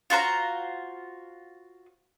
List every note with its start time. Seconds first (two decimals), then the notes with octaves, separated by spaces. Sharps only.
0.10 F4 F#4 C5 A#5